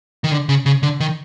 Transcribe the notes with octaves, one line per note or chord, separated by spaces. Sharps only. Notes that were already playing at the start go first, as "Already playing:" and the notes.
D#3
D3
C#3
C#3
D3
D#3